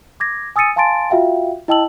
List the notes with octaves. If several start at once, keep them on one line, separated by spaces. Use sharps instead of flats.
D6 G#6 A#6
G#5 D#6 E6 A6 C#7 D#7
F5 G#5 A5 C6 A6 D7
F4 F#4 E5 F5 G5
E4 D#5 G5 A5 E6 F#7